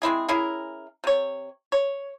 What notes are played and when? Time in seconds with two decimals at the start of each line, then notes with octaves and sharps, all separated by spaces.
0.02 G#3 C4 E4 G#4
0.29 C#4 E4 G#4 A#4
1.04 C3 C#5
1.72 C#5